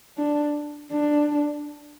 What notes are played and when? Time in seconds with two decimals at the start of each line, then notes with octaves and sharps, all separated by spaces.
0.18 D4
0.92 D4